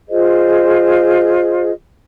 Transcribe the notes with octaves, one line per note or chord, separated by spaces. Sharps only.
F4 G#4 C5 D#5